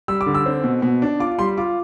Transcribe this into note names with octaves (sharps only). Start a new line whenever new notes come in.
G3 E6
D6
D3
E6
C4
B2
B2
D4
F4 D6
G3 C6
F4 D6